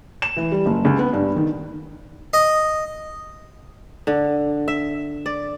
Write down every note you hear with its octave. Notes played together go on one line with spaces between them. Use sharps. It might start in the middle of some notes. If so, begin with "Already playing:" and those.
E7
E3
G3
F#1
C#2
B3
G2
D#3
D#5
D3
E5
D5